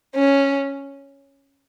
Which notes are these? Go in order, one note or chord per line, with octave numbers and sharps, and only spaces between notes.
C#4